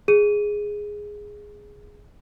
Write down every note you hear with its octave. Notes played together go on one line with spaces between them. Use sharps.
G#4 D#7